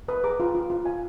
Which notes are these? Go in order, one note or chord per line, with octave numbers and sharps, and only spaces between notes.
B4 B5 D#6
G#4 A#5 D6
F4
F4
F4
F4 F5 G#5